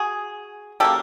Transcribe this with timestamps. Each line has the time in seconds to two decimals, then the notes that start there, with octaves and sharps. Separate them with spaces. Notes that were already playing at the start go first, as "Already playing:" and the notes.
Already playing: F#4 G#4
0.80 C#3 F#3 A#3 G4 A4